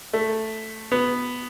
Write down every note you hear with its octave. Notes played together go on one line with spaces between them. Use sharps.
A3
B3